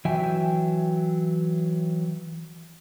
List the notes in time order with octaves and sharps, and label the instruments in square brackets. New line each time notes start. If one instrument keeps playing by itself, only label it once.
[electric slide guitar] E3 F#3 E5 G5 G#5